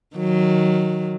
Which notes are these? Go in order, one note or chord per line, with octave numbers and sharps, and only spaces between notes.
D#3 F#3